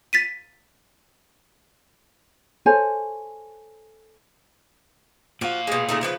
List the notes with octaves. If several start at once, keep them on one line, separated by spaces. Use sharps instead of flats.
A6 B6 D#7
A4 C5 C#5 G#5
A#2 F3 F#4 F5
B2 G#3
C#3 A3 D#4
C#3 F3 B4